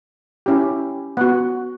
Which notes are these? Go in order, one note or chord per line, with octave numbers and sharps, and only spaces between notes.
C#4 E4 G4
B3 F#4 F#5